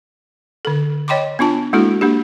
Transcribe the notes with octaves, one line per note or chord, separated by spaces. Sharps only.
D3 A4
C#5 D#5 G5 B5 C6 D6
B3 D4 F4 A5
G#3 A#3 D4 E4 F#4 A4
A#3 D4 G4